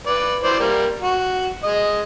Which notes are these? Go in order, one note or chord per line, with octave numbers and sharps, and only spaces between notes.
B4 D5
E3 C5 D5
G3 A#3
F#4
G#3 D#5